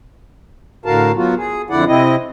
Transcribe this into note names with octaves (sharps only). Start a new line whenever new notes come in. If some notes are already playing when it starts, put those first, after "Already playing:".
A2 D3 F#4 A#4 F5 A5
F#3 B3 F4 F#4
G#4
F2 D3 E4 D5 F#5
C3 C4 E4 D#5